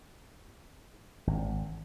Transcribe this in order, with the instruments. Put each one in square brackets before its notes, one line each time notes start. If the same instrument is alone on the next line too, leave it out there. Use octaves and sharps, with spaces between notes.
[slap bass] G#1